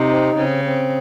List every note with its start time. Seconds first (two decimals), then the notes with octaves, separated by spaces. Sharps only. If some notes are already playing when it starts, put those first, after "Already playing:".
Already playing: C3 D#4
0.10 C4
0.36 C#3 C4
0.64 C4